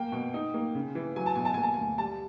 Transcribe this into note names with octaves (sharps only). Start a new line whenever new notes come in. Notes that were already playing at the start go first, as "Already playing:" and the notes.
Already playing: A#3 G5
B2
D#4
A#3
C#3
E3
F#3 G#5
A5
B2 G#5
A5
A#3 G#5
A5
D2 G#5
G3 A5